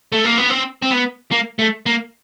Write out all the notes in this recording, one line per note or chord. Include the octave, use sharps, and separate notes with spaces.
A3
A#3
B3
C4
C4
B3
A#3
A3
A#3